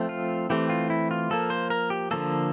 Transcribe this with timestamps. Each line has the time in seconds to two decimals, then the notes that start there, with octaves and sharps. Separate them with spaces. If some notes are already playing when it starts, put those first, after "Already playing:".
Already playing: F3 A3 C4
0.09 F4
0.50 E3 A3 C4 G4
0.70 F4
0.90 E4
1.11 F4
1.30 F3 A#3 A4
1.50 C5
1.70 A#4
1.90 G4
2.11 D3 F3 A#3 A4